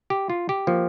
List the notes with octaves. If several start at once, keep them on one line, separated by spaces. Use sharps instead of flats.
G4
F4
G4
F3 A#3